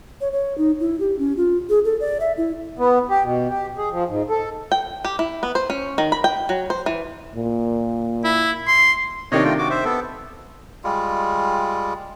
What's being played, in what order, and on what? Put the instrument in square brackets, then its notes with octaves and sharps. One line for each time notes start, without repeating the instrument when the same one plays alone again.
[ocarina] C#5
C#5
D#4
E4
G4
C#4
F4
G#4
A4
D5
E5
E4
[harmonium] B3
G4
B2
G4
G#4
F3
G#2
A4
[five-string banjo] G5
G4
E4
B3
C5
C#4
D#3
B5
G5
F#3
C5
E3
[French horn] A#2
[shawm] E4
C6
[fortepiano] C3 D#3 D4 [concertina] C#5 D#5
[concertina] A3 F4 G5
F#4 D6
C5 E5
B3 A4
[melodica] G3 G#3 F4